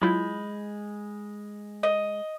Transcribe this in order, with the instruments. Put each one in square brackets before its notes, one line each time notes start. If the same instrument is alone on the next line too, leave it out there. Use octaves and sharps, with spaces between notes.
[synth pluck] F#3 E4 F4 [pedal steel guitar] G#3 B5 G6
[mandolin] D#5